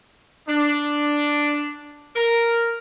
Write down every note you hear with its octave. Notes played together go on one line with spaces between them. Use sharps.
D4
A#4